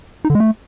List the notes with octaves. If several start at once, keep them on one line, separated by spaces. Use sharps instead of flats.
D#4
D3
G#3
A3